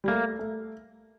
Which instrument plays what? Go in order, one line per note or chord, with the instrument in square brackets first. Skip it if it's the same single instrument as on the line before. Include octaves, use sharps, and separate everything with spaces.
[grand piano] G3
[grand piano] A3 [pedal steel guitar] A#3
[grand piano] A3